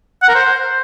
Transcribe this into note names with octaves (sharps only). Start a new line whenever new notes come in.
F#5
A#4
C5